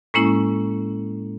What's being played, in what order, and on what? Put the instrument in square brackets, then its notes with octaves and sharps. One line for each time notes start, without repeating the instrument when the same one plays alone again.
[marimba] A2 G#3 A#3 C#4 E4